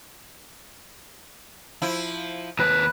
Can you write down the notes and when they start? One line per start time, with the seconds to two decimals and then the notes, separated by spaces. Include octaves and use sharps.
1.82 F3 E4
2.59 D#2 B4 F#6